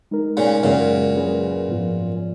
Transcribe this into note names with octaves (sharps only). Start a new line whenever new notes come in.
G#3 D#4 A#4
A#2 C#3
F#2 A#2 C#3 G#3 C#4 G#4
F#3 C#4 G#4 B4
G#2 F3 B3 F4